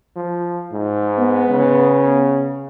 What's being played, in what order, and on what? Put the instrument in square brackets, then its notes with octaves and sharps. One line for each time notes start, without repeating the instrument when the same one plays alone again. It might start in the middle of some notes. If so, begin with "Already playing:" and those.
[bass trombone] F3
G#2
[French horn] B3
[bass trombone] C#3